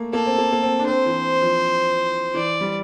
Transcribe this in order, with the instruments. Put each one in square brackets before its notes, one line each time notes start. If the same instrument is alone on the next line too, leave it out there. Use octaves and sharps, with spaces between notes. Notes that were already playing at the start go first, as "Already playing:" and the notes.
Already playing: [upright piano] A3 A#3
[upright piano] A#3 [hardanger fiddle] A4
[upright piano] C4
A#3
A#3
C4
D4
[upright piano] C4 [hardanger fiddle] C5
[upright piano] E3
F3
[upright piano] E3 [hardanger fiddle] D5
[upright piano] G3